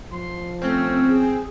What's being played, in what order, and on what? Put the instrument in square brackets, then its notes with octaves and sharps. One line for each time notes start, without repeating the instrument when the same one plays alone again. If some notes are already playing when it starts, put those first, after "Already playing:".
[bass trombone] F3 [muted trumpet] C6
[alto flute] A3 [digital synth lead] C4 [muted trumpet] C#4
[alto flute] G#4